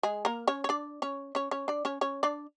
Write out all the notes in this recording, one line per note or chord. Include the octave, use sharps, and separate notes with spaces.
G#3 G#4
A#3 A#4
C#4 C#5
C#5
D4 D5
C#4 C#5
C#4 C#5
C#4 C#5
D4 D5
C#4 C#5
C#4 C#5
D4 D5